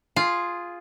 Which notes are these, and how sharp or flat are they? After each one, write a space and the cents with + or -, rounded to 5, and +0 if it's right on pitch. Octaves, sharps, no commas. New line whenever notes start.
F4 +0 G#4 +0